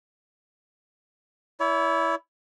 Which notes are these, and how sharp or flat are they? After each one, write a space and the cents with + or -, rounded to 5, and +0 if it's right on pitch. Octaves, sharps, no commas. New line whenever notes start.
E4 +0 C#5 +45